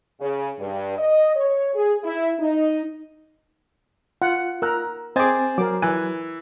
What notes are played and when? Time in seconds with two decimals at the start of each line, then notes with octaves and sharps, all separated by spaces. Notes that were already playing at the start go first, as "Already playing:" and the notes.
0.21 C#3
0.59 G2
0.98 D#5
1.36 C#5
1.74 G#4
2.04 E4
2.40 D#4
4.22 F4 F#5
4.62 A#4 A#5 E6 F#6
5.16 C4 G#4 C5 D#5 G#5 D6 A6
5.58 F#3 A#4 D6
5.82 E3 G#5 F#6